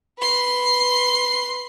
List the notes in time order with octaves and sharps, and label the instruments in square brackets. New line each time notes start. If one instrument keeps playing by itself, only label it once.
[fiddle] B4 C6